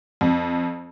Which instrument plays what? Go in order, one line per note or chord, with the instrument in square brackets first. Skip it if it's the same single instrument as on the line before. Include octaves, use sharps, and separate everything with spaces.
[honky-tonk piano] F2